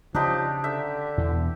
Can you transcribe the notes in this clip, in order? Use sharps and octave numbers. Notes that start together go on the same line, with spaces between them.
C#3 F3 D4 D#4 G4
D3 E5
E2 B2 E3